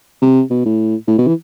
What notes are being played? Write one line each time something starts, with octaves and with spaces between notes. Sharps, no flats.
C3
B2
A2
A2
B2
E3